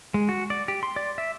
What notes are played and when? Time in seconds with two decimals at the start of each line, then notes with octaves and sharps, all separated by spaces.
0.14 G#3
0.29 F#4
0.50 D5
0.68 G4
0.83 C6
0.96 D5
1.18 E5